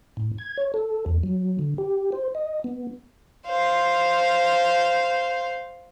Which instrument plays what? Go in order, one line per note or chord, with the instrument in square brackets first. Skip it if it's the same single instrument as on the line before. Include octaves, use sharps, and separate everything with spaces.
[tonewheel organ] A2
G#6
C#5
A4
E2
F#3
D3
G4
C5
D#5
B3
[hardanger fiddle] C5 F5